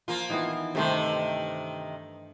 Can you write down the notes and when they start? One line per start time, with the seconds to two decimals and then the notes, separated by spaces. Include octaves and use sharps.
0.08 F3 A#3 F4
0.30 D#3 E3 B3
0.75 G2 C3 D#3 A3 C5